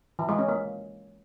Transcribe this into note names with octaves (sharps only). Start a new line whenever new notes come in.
E3
G#3
C#4
A#3